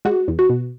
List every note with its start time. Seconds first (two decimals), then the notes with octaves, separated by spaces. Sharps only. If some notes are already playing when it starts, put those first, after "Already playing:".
0.05 G#3 F#4
0.28 E2
0.39 F#4
0.49 B2